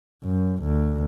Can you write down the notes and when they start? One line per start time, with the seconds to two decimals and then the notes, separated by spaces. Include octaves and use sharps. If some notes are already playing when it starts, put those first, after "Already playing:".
0.24 F#2
0.63 D2